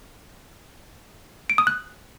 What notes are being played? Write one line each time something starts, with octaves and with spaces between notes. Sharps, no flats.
D7
D#6
F#6